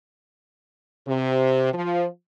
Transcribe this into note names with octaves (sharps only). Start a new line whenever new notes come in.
C3
F3